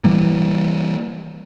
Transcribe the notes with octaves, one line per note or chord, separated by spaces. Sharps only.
E3 G3 A#3